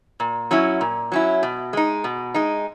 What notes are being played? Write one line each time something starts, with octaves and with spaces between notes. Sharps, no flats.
A#2
F#3 C#4 E4
A#2
F#3 C#4 E4
B2
G#3 D#4
B2
G#3 D#4